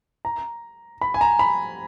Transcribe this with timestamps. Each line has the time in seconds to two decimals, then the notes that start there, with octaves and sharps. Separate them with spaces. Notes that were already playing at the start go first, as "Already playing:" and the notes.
0.25 A#5
1.01 B5
1.14 G#5
1.21 A#5
1.39 B5